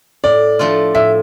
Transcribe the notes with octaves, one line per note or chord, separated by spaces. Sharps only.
A2 D5
F3 A3 D4 F4
A2 E5